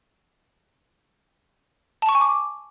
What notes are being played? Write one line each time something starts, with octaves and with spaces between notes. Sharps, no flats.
A5
C#6
G#5
D6